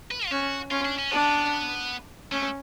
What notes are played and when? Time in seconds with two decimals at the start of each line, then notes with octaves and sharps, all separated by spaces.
0.11 B4
0.26 F4
0.31 C#4 F#4
0.71 C#4 F4
0.85 D4
0.98 C#4
1.11 B3 D4
2.32 A3 C#4